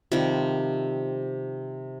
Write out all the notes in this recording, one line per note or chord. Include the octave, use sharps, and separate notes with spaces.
C3 D#3 F3 G3